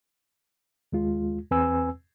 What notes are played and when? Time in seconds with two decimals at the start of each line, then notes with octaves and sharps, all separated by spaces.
0.92 D#2 G#3 F4
1.51 E2 C4 B4 G#5 E6